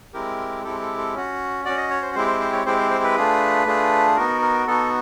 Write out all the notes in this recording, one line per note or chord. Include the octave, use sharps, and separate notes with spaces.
G#3 C4 E4 G4 A#4
G#3 C4 E4 G4 A4
A4
A4
C#4 F#4
C#4 F#4 D5
D#5
C#5
C5
G#3 C4 E4 G4 C5
C5
C5
C#5
G#3 C4 E4 G4 C5
C5
C5
B4
A3 D4 F4 G#4
A3 D4 F4 G#4
B3 D#4 F#4 A#4
A#4
B3 D#4 F#4 A4